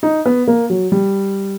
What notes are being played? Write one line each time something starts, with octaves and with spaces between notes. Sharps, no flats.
D#4
B3
A#3
F#3
G3